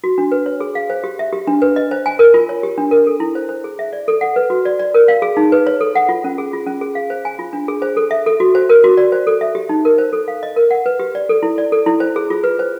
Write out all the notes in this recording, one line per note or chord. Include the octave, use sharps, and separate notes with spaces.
F#4
D4
B4
C#5
G#4
F5
C5
G4
E5
G4
D4
B4
D#5
C5
G#5
A#4
F4
C#5
G4
D4
A#4
A4
E4
C5
C5
G#4
E5
D5
A4
F#5
B4
F#4
D5
D5
A#4
F5
G#4
D#4
B4
C#5
A4
F#5
F4
C#4
G#4
F4
C#4
G#4
F5
C5
G#5
F4
D4
G#4
C5
A4
E5
A4
F#4
C5
A#4
F#4
D5
C5
A4
E5
G4
D#4
A#4
C5
A4
F5
D#5
A#4
F#5
B4
G4
D5
A4
E4
D5
A4
E4
C5
G#4
F4
B4
C5